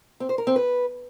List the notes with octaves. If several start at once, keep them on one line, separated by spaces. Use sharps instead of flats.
C4
C5
A#4
C4
B4